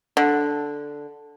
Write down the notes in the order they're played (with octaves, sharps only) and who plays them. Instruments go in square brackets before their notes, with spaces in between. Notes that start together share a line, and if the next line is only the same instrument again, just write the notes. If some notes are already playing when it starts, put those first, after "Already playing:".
[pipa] D3